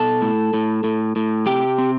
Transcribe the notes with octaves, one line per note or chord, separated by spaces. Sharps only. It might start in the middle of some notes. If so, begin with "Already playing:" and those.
Already playing: B2 A4 A5
A2
A2
A2
A2
C3 G4 G5
C4